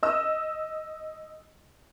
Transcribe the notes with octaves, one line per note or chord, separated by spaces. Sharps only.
D#5 E6